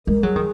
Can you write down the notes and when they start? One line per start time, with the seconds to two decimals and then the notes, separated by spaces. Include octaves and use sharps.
0.07 G#3 A#4
0.23 F#3 G#4
0.36 D#3